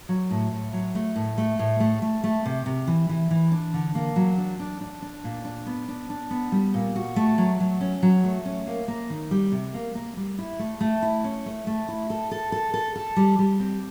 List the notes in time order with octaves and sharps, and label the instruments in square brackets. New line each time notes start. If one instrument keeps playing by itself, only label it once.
[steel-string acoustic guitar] F#3
A2
A2
F#3
A3
A2
A3
A2
A3
A3
A3
C3
C3
E3
E3
E3
D4
D3
A#3
F#3
D4
D4
D4
D4
A#2
D4
B3
D4
D4
B3
G3
A#2
F#4
A3
F#3
F#3
C#4
F#3
A3
C#4
A#3
A#3
D#3
G3
C3
A#3
A#3
G3
E4
A3
A3
E4
C#4
A3
A3
E4
A4
A4
A4
A4
A4
G3
G3
C4